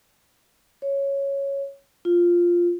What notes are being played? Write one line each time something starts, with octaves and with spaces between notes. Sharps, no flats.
C#5
F4